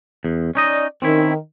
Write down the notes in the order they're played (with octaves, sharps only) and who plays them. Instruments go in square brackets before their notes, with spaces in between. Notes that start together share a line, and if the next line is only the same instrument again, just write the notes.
[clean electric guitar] E2
[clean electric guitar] C#4 D#4 D#5 [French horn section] D5
[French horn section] D#3 [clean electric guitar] C4 C#4 E4